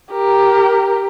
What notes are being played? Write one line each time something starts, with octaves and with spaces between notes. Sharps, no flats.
G4 A#4